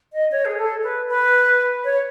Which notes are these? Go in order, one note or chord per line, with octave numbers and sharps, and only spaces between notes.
D#5
C#5
G#4
A4
B4
B4
C#5